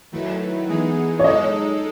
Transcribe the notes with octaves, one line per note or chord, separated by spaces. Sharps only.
D#3 F#3 A3 E4 B4
E3 G#3 B3 D#4 G#4
C#5
G#3 D#4 A4 D#5